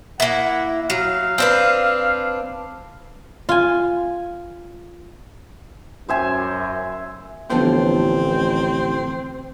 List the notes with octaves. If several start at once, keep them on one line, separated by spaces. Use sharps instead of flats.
A#3 E4 F#5
F#3 F5
C4 D4 B4
F4 G#5
F#2 C5 E5 G#5
A1 D3 F3 B3 C4